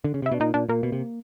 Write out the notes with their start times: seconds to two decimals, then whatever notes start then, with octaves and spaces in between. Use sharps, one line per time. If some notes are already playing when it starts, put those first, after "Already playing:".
0.04 D3
0.14 C#3
0.22 C3 E4
0.32 B2 D4
0.40 A#2 D#4
0.54 A#2 D4
0.69 A#2 A#3
0.83 B2
0.92 C3